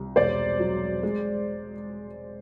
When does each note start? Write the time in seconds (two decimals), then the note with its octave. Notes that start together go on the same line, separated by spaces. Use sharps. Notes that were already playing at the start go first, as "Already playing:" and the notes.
Already playing: C2
0.16 E1 C5 D5
0.60 F#3
1.03 G#3